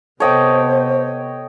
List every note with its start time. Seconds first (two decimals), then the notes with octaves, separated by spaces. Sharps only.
0.20 C3 B3 A4 C5 C#5 D#5 G5 D6